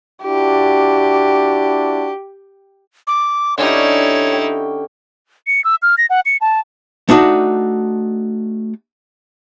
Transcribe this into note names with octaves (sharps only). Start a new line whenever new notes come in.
D4 E4 F#4 G4
D6
D3 C#4 D#4 E4 G4 C#5
G5
C#7
E6
F6
A#6
F#5
C#7
A5
A3 D4 D#4 F#4